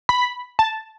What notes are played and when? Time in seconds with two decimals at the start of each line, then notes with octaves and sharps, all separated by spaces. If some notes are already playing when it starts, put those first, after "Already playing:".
0.09 B5
0.59 A5